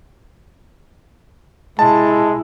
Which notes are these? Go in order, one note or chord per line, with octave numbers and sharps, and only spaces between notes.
C3 G#3 E4 A5